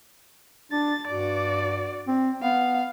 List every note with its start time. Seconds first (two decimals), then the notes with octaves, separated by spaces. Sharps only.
0.72 D4 A6
1.08 G2 F#4 D5
2.07 C4
2.43 B3 F5